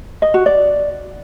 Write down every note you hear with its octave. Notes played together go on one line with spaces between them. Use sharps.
D#5
F#4
D5